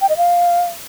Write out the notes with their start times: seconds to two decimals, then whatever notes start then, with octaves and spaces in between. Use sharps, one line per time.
0.01 G5
0.09 D#5
0.17 F5